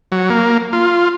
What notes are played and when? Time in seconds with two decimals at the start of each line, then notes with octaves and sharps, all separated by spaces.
0.12 F#3
0.30 A#3
0.73 F4